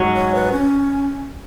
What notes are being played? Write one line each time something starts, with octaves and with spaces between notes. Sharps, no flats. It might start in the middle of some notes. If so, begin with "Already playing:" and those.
Already playing: G#2 F#3 C#4
C#5
B4
C#4